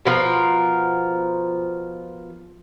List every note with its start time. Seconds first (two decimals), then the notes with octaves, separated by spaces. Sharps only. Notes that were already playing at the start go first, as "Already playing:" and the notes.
0.05 B2 F3 A#4